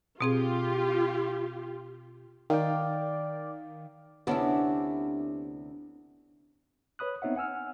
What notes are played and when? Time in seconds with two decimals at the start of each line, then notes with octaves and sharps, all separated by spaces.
0.21 B2 C4 F4 G4 G#4
2.50 D#3 D5 F5 G5
4.27 D2 C3 B3 C#4 D4 E4
6.99 B4 C#5 B5 D#6 F#6
7.22 B3 C4 D#4 C#5 E5 F#5
7.36 F#5 G#5 E6 F6